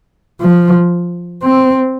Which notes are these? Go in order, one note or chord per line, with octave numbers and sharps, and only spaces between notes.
F3
C4